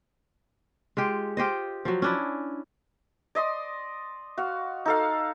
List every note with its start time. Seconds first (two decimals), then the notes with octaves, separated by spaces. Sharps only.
0.97 G#3 F4 G4
1.37 F4 G4 C5 D#5
1.85 F3 F#3
2.02 C#4 D4 E4
3.35 D5 D#5 C6 D#6
4.37 F#4 F5
4.85 D#4 A4 F5